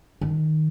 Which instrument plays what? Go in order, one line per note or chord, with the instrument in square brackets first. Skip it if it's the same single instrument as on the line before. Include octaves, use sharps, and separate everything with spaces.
[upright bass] D#3